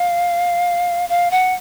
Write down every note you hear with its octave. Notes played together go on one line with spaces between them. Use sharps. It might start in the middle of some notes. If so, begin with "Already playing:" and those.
Already playing: F5
F5
F#5